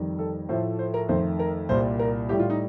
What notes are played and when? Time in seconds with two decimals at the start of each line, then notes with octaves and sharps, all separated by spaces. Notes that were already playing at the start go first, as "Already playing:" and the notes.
Already playing: F2 D#3 G3
0.19 A4
0.49 A2 F3 A3 C5
0.79 C5
0.94 A#4
1.09 F2 D#3 A3 C5
1.39 A#4
1.69 C2 A#2 G3 C5
1.99 A#4
2.29 A2 G3 G4
2.39 F4
2.50 D#4